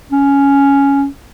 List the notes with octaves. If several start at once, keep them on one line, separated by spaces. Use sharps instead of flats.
C#4